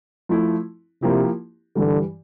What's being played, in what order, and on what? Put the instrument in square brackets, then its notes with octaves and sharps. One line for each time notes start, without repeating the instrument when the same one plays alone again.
[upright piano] F3 A3 E4
[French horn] C3 [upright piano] F3 A#3 E4 G4
[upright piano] G2 E3 G3 [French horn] D3